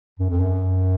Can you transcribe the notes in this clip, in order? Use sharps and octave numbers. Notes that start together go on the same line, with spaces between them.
F#2
F2
F#2